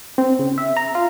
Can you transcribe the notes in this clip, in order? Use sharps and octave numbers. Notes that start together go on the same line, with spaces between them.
C4
C#3
E5
A#5
F4